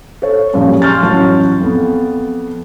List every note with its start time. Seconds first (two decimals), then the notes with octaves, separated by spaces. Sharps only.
0.22 A4 C#5
0.53 F#2 A#2 C#3 F3 G3
0.82 C6 C#6 F6 G6 A6
1.02 A1 F#3 F#4 A5
1.60 F2 B3